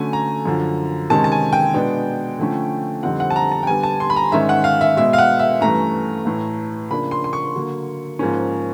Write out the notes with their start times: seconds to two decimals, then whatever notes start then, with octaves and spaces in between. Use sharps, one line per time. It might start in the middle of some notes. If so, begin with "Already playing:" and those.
Already playing: D3 F#3 A3 C#4 G#5
0.13 A#5
0.45 F#2 D3 F3
1.10 C3 D#3 G#3 C#4 A5
1.24 A5
1.32 G#5
1.53 G5
1.74 B2 G#3 B3 D4
2.39 D3 F3 A3 C#4
3.03 F2 D3 G3 C4 D#4 F#5
3.20 F#5
3.30 A5
3.36 A#5
3.52 A5
3.63 G5
3.67 D3 G3 B3 G#5
3.83 A5
4.00 C6
4.10 B5
4.16 A#5
4.32 G#2 D#3 G#3 C#4 E5
4.49 F#5
4.64 F5
4.81 E5
4.97 B2 G#3 B3 E5
5.13 F5
5.18 F#5
5.39 E5
5.61 G2 E3 A3 C#4 A#5
6.25 A2 E3 A3
6.90 C#3 F3 A#3 D4 B5
7.11 C6
7.24 C6
7.33 C#6
7.55 D3 F#3 A#3
8.19 G#2 F3 A#3 C#4